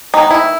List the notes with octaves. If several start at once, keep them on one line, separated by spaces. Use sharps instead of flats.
D#3 G#3 B3 D#4
E4